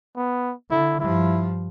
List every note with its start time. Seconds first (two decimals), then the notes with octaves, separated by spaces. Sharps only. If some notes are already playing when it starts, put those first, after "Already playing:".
0.16 B3
0.71 D3 E4
1.00 G2 F3 E4